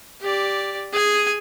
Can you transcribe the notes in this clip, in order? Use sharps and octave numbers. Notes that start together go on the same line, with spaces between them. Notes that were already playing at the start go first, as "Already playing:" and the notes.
G4 D5
G#4 G#5